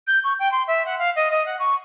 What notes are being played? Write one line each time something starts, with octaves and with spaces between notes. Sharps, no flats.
G6
C#6
G5
C6
E5
F#5
F5
D#5
D#5
F#5
C#6